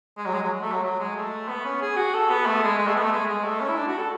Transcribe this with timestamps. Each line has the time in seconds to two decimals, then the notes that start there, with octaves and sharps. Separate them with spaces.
0.18 G#3
0.26 F#3
0.34 G#3
0.43 F#3
0.61 A3
0.72 F#3
0.84 F#3
0.99 G#3
1.16 A3
1.48 B3
1.65 C#4
1.81 G#4
1.97 F#4
2.14 A4
2.30 B3
2.46 A3
2.63 G#3
2.78 G#3
2.87 A3
2.96 B3
3.03 A3
3.12 G#3
3.27 G#3
3.44 A3
3.61 C#4
3.69 E4
3.77 D4
3.88 F#4
3.98 A4